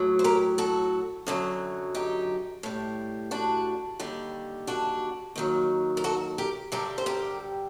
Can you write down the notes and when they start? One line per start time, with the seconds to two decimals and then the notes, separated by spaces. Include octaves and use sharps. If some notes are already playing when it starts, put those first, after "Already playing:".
Already playing: A2 F#3
0.19 C5
0.24 G4 A#4
0.58 F#4 A4
1.27 F#2 D3 F#3
1.95 D#4 G4
2.63 A2 G3
3.31 D4 F#4
4.00 D#2 D3 G3
4.67 D4 F#4
5.36 D#2 D#3 F#3
5.97 A#4
6.04 F#4 A4
6.38 G4 A#4
6.72 G2 D3 G3 G4 A#4
6.98 C5
7.06 G4 A#4